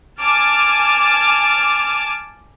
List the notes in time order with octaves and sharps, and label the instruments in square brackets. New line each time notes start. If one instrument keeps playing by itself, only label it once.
[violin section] G#5 A5 D6 F6